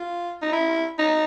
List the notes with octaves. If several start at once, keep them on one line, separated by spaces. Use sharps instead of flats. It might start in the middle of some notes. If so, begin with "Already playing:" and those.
Already playing: F4
D#4
E4
D#4